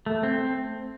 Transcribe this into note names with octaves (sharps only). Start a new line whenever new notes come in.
A3
C4